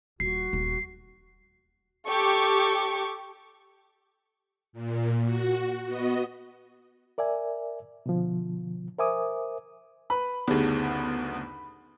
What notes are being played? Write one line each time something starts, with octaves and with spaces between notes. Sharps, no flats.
D#1 F#4 C7
D#1
G4 A4 C#6 D6
A#2
F#4
B3 F#4 D#5
A#4 D5 E5 G#5
B2 D3 F3
A#4 C5 E5 G#5 D6 D#6
B4 B5
F#1 D2 B3 D#4 G4 G#4